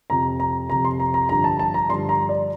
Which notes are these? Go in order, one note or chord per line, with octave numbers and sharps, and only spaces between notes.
F2 C3 F3 A#5
A#5
F2 C3 F3 A#5
C6
A#5
A#5
G2 D3 F3 A#5
A5
A5
A#5
G2 D3 F3 C6
A#5
D5